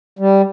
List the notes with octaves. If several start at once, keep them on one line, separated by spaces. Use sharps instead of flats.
G3